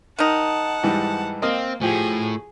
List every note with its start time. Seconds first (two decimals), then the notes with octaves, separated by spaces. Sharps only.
0.19 D#3 D#4 F#5 A5
0.83 G#2 E3 G3
1.42 A#3 C4 D#5 F5
1.82 A2 F3 G4 G#4